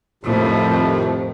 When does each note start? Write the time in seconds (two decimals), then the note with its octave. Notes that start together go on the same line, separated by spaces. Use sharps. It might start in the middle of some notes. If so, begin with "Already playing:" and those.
0.24 F2 A2 C3 D#3 F3